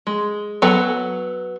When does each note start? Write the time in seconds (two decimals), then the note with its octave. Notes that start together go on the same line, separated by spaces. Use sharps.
0.07 G#3
0.62 F#3 B3 A4 G#5